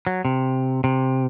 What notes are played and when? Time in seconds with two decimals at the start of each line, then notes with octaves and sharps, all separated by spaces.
0.07 F#3
0.25 C3
0.84 C3